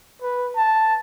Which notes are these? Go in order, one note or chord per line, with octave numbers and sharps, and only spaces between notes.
B4
A5